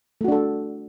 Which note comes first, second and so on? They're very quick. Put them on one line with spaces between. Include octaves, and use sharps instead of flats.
A3 F#4 D4 A4